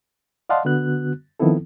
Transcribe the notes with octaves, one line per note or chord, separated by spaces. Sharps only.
D5 D#5 F5 F#5 A5 C6
D3 B3 F#4 F#6
D#3 F3 B3 C4 E4 A4